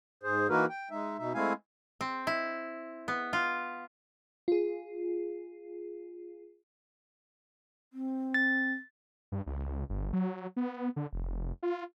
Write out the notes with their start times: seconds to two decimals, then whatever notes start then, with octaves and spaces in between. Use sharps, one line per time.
0.23 G#2 G#4 C5
0.49 E3 A#3 D#4 F#4 A#4 B4
0.69 G5
0.91 G#3 D#4 E5
1.19 B2 D#4 E5
1.34 G#3 A3 C4 E4 F5 G#5
2.01 C4
2.27 E4
3.08 B3
3.33 F4
4.48 F4 G#4
7.93 C4
8.34 A6
9.32 G2
9.46 C#2
9.90 G1
10.13 F#3
10.56 B3
10.96 D3
11.12 F1
11.63 F4